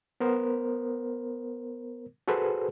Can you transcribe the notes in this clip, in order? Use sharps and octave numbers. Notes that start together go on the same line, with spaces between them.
B3 A#4 C5
F#4 G#4 A4 B4 C5